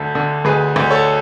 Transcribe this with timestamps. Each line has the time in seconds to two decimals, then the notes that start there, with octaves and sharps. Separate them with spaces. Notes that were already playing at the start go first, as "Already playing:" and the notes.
Already playing: D2 D3
0.15 D3
0.45 D2 G#4 B4
0.76 D2
0.90 A4 C#5